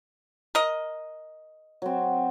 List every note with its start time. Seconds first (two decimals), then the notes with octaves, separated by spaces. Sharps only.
0.55 A#4 D#5
1.82 F#3 C4